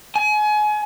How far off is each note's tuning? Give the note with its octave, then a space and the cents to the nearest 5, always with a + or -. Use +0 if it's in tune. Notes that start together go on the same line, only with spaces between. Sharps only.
G#5 +30